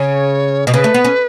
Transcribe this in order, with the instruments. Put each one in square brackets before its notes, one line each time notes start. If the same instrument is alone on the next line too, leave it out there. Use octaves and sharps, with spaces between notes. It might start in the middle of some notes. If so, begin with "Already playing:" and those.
Already playing: [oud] C#3 [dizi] C#5
[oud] B2
[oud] C#3 [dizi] B4
[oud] A3
B3
C#4